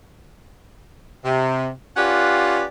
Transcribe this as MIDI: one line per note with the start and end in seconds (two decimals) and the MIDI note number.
1.25 1.68 48
1.97 2.64 61
1.97 2.64 65
1.97 2.64 67
1.97 2.64 71
1.97 2.64 74
1.97 2.64 78